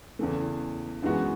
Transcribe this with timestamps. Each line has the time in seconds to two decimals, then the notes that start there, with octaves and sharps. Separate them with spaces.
0.19 E2 C#3 E3 A3
1.03 F#2 E3 G#3 B3 F#4